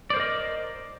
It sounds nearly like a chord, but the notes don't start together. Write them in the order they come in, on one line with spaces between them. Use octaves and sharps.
D5 C5 A#4 D#5